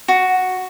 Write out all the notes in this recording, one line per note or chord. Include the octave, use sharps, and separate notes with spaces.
F#4